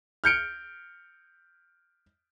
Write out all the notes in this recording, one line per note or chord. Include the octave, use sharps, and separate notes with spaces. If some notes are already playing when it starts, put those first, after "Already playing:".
F6 G6 C#7 D7